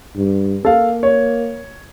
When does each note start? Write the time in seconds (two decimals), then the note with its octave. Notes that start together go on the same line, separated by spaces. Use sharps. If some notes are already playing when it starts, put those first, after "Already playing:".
0.16 G2
0.65 A#3 A4 F5
1.03 C#5